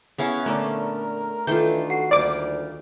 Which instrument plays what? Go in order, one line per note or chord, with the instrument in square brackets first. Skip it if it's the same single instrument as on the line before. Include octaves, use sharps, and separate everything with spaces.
[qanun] B3 C#4 F5 [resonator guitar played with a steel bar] E4 G#4 C#5
[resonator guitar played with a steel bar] A#2 D3 D5 [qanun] A3 [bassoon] A#4
[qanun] D#3 F4 [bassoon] E3 [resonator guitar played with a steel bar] D4 A4 [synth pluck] G6
[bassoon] F#4 [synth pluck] C7
[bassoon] D2 [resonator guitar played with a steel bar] G3 A#3 D#4 [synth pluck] D5 D6